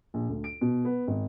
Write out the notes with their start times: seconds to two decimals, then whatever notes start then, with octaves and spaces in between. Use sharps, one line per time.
0.14 A#1
0.29 D2
0.44 D7
0.61 B2
0.85 B3
1.07 G#1